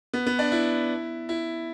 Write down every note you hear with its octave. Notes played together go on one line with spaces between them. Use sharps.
B3
B3
D4
E4
E4